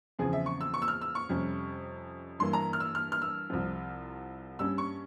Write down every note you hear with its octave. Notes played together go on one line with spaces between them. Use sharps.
E2 C#3 F3 C4 G#4
E5
C#6
E6
C#6
E6
F6
E6
C#6
F2 C3 G3 C#4
G2 E3 A#3 C6
A#5
F6
E6
F6
F6
E6
C2 C3 F3
G2 G3 C#4 E6
C#6